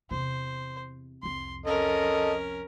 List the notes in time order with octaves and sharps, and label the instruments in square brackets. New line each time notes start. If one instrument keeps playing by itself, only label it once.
[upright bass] E2 C3 [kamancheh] C5
[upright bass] C2 F2 [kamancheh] C6
[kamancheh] C#4 A#4 [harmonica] A4 D#5